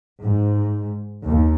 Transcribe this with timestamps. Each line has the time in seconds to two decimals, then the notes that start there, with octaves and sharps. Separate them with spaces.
0.22 G#2
1.25 D#2